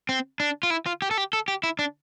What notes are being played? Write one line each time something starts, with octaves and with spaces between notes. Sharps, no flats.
C4
D4
F4
E4
F4
G4
A4
G4
A4
G4
E4
D4